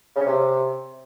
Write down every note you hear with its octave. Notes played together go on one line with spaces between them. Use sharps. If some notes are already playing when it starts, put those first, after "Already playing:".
C#3
C#4
C3